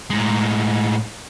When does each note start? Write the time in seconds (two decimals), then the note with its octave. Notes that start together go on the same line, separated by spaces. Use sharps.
0.10 A2 G#3